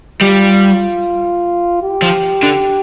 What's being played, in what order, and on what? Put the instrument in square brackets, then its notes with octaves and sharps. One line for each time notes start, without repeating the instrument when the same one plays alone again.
[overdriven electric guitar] G3 [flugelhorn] F4
[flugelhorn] G4
[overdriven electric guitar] F3
D3